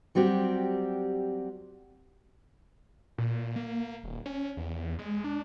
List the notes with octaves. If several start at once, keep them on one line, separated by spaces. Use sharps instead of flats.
F#3 G3 C4 F#4 G4
A#2
A#3
D#1
C#4
E2
G#3
D4